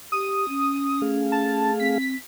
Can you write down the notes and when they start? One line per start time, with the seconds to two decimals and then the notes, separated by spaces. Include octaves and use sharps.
0.12 G4 D#6
0.49 C#4
1.02 A3 G#4 F5
1.32 A5
1.80 C4 B6